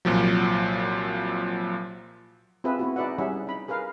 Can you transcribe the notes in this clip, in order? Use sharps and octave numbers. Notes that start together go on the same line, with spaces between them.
C2 A#2 F3 F#3
C4 F4 G#4 B4 E5
B3 E4 F#4
D#4 G#4 B4 D5 E5 F#5
G3 C#4 E4 G#4 E5 F#5
D#4 B5
G#4 A#4 B4 F5